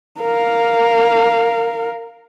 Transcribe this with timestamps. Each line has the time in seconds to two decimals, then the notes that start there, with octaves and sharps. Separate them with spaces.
0.21 A#4 F5